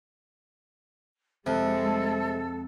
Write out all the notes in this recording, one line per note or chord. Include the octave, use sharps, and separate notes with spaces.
F2 C3 G#3 A4